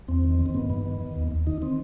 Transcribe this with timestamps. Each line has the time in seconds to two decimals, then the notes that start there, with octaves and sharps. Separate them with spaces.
0.08 E2 C4
0.24 D#3
0.39 D#3
0.46 C4
0.54 G2 B3
0.70 G2 B3
0.85 D#3
1.01 D#3
1.16 D#2
1.32 D#2
1.47 D#3 D#4
1.62 D#3 C4